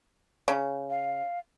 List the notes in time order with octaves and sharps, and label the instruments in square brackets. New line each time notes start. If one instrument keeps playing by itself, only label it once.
[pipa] C#3
[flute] F5